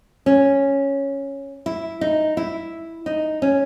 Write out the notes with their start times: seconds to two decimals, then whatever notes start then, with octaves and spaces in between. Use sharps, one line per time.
0.26 C#4
1.66 E4
2.01 D#4
2.37 E4
3.06 D#4
3.42 C#4